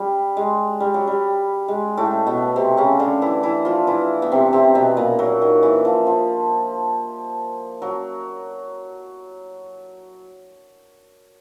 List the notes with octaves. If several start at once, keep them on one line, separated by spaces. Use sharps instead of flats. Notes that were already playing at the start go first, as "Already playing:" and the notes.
Already playing: G3
G#3
G3
F#3
G3
G#3
A2 A3
B2 B3
C3 C4
C#3 C#4
D3 D4
E3 E4
E3 E4
F3 F4
E3 E4
B3
C3 C4
C3 C4
B2 B3
A#2 A#3
F#3
D#3
E3
F3
F3
F#3